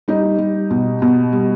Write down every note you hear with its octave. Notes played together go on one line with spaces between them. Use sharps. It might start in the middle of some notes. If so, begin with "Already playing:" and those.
G3 D#4 G4
G3
B2
B2
G3